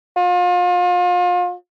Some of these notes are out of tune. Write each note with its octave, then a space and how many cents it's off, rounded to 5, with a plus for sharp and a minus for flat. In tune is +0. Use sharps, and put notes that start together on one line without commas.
F4 +35